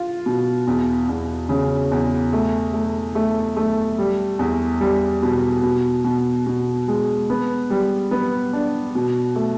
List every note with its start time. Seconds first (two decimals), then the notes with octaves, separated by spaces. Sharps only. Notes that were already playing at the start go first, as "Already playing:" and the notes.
Already playing: F4
0.26 B2
0.67 E2
1.09 E2
1.49 C#3
1.92 E2
2.33 A3
2.73 A3
3.15 A3
3.57 A3
3.98 G3
4.39 E2
4.81 G3
5.22 B2
5.63 B2
6.04 B2
6.47 B2
6.88 G#3
7.30 B3
7.70 G3
8.11 B3
8.53 D4
8.95 B2
9.36 A3